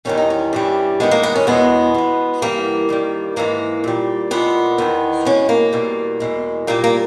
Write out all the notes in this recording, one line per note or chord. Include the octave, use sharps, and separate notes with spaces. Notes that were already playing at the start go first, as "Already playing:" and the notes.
E2 D#3 G3 C#4
D#4
C#4
G2 E3 G3
G2 D#3 G#3 B3
A#3
B3
C#4
E2 B2 G#3 B3
B2 G#3
G2 E3 G3 A#3
G2 D#3 G3
G#2 E3 G#3 A#3
A#2 G3
A#2 G#3 B3
E2 D#3 G#3
B2 G#3 C#4
A#3
E2 B2 G3
E2 B2 G#3
A#2 G3 A#3
A#3